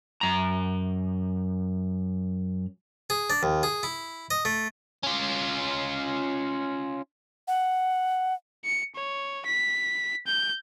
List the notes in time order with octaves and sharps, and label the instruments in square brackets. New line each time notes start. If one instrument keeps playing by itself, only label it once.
[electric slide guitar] F#2 A#5
[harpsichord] G#4
D4
D#2
G#4
E4
D#5
A3
[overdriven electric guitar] C#4 F4
[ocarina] F#5
[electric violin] C#7
C#5
B6
G6